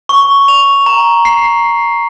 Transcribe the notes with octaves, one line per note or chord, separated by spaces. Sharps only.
C#6
F7
A#5
C7